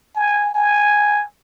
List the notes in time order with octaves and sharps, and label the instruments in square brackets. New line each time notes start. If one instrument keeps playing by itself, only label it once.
[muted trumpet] G#5
G#5